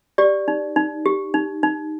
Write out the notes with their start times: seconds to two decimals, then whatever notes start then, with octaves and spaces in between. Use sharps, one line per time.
0.18 G4 D5
0.48 D#4
0.76 D#4
1.06 G4
1.34 D#4
1.63 D#4